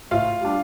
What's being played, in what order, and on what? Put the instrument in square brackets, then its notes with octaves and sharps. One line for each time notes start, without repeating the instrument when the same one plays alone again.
[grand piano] A2 F4 F5
G3 D4